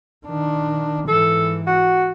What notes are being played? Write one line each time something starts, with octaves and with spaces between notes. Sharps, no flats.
D#3 D4
G#2 E3 A4
F#4